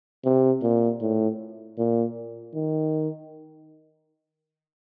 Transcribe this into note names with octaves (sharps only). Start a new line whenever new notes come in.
C3
A#2
A2
A#2
D#3